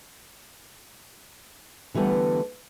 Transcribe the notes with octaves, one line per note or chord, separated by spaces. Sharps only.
D3 E3 G3 A3 B3